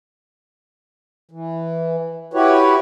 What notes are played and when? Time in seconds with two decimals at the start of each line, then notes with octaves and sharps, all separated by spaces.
1.31 E3
2.34 E4 F#4 G4 B4 C#5